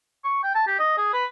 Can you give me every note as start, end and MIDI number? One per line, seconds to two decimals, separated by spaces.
0.24 0.40 85
0.43 0.53 79
0.55 0.66 81
0.67 0.79 67
0.79 0.95 75
0.98 1.13 68
1.13 1.26 71